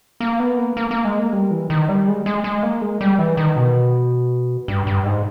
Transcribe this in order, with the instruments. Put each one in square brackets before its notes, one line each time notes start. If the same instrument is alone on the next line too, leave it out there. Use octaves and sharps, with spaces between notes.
[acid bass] A#3
B3
A#3
A#3
A#3
G#3
A#3
G3
E3
D#3
G3
G#3
G#3
G#3
A#3
G#3
G3
E3
D#3
B2
G2
G2
G#2